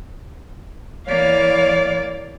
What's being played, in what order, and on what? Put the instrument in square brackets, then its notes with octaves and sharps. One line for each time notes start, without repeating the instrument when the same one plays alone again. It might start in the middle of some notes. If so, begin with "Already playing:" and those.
[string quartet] E3 C#5 F5 [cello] A#3 D5